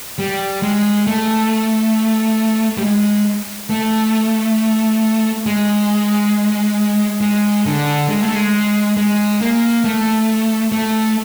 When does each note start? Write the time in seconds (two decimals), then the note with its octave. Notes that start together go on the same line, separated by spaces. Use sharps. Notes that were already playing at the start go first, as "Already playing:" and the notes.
0.19 G3
0.62 G#3
1.07 A3
2.78 G3
2.83 G#3
3.70 A3
5.46 G#3
7.21 G#3
7.66 D3
8.09 G#3
8.22 A3
8.35 G#3
8.97 G#3
9.41 A#3
9.84 A3
10.72 A3